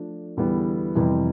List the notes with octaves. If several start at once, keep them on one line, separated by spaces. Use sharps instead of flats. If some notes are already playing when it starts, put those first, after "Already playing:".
Already playing: F3 A3 D4
E2 D3 G3 B3 E4
F2 C3 E3 G3